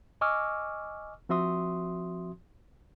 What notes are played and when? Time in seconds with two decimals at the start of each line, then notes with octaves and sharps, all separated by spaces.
0.21 D#5 G#5 C#6 D6 E6 F6
1.29 F3 C4 F#4 E5 C6 D#6